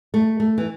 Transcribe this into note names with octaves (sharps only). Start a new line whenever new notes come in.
A3
A3
E3